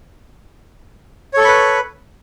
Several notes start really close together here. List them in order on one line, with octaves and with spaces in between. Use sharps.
C#5 A4 C#6 B5 B4